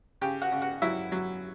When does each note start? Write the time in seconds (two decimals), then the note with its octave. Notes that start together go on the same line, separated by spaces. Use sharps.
0.21 C#3 G4 G5
0.42 F#4 F#5
0.52 C#3
0.62 F#4 F#5
0.82 F#3 E4 E5
1.12 F#3